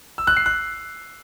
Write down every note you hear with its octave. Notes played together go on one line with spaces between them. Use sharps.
E6
F#6
C7
F#6